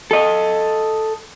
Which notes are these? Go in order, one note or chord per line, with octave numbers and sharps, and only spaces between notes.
A4 D#5